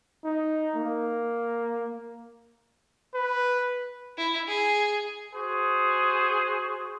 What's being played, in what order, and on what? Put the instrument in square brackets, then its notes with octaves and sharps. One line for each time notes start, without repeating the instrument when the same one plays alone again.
[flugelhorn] D#4
A#3
[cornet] B4
[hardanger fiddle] E4
G#4
[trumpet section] F#4 G#4 C5